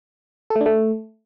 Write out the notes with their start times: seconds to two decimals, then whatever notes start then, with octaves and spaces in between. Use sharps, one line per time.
0.50 A4
0.56 A3
0.61 D4
0.66 A3